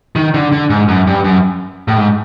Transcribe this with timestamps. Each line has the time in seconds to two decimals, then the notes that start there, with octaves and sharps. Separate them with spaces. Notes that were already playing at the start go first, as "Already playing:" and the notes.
0.16 D#3
0.34 D3
0.52 D3
0.70 G#2
0.88 F#2
1.07 G2
1.24 F#2
1.88 A2
1.98 G#2